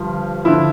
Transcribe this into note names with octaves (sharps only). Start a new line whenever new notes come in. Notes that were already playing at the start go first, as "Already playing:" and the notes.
Already playing: G2 D3 F3
D3 F3 E4